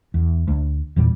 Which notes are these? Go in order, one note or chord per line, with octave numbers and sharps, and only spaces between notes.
E2
D2
E2 A#2 E3 G3